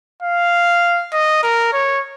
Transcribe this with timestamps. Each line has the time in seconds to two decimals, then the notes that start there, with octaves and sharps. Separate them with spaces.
0.23 F5
1.13 D#5
1.43 A#4
1.73 C#5